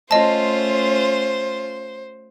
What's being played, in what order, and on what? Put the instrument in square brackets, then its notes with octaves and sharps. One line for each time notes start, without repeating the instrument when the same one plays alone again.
[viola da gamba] A3 C#4 F4 [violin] C5 [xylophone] D#5 A5